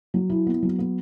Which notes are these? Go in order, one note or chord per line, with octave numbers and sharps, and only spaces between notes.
F#3
E4
B3
F#3
B3